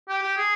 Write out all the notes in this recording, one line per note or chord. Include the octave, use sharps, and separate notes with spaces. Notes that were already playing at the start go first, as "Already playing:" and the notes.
G4
G4
G#4